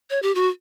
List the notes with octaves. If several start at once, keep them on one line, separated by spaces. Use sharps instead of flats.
C#5
G4
F#4